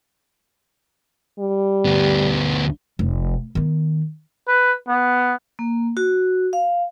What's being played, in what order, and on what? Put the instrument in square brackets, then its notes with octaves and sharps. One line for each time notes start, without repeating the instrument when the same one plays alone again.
[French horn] G3
[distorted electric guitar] D2 B3
[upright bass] F1
D#3 B3
[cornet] B4
B3
[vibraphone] A#3
F#4
F5